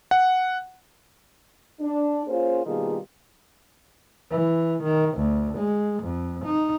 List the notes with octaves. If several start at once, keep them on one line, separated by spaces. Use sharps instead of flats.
F#5
D4
A#3 C#4 F4 G#4 C5
B2 D#3 G3 A#3 F4 G#4
E3
D#3
D2
G#3
F2
D#4